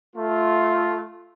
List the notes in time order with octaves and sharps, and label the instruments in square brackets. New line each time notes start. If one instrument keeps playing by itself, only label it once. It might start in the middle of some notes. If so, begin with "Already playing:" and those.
[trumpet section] A3 F4